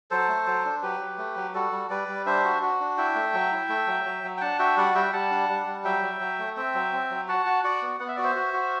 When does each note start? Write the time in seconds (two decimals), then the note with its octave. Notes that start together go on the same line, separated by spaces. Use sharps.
0.11 F#3 A4 C5
0.28 A3
0.46 F#3
0.65 D4
0.83 F#3 G4 B4
1.00 F#3
1.18 A3
1.36 F#3
1.54 G3 F#4 A4
1.72 G3
1.90 G3 B4 D5
2.08 G3
2.26 D4 C5 E5
2.45 F#4
2.62 F#4
2.81 D4
2.97 E4 E5 G5
3.15 A3
3.34 F#3
3.52 E4
3.69 A3
3.87 F#3
4.05 F#3
4.24 F#3
4.37 G5
4.41 D4 F#5 A5
4.59 F#4 E5 G5
4.77 G3 D5 F#5
4.95 G3 E5 G5
5.13 G3 F#5 A5
5.31 D4
5.49 G3
5.67 G3
5.84 F#3 E5 G5
6.02 F#3
6.20 F#3
6.39 A3
6.57 C4 E5 G5
6.75 F#3
6.93 C4
7.11 F#3
7.28 F#4 F#5 A5
7.46 F#4
7.64 F#4 D5 F#5
7.82 B3
8.00 B3 F#5
8.08 E5
8.17 F#4 D5
8.23 C5 E5
8.35 F#4
8.53 F#4